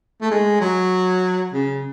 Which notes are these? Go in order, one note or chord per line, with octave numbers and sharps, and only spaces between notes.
A3
G#3
F#3
C#3